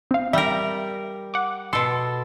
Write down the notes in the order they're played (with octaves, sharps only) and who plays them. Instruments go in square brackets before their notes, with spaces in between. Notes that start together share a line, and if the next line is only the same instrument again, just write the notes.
[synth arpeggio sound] C4 F5
[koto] G3 A#4 [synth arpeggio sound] E5 G5
[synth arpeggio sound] F#5 D6
[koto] B2 A4 [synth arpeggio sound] C6